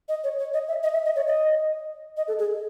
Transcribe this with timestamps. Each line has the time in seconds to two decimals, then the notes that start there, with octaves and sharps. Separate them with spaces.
0.09 D#5
0.24 C#5
0.38 C#5
0.54 D#5
0.68 E5
0.83 D#5
0.94 E5
1.05 D#5
1.16 C#5
1.28 D#5
2.17 D#5
2.28 A4
2.39 G#4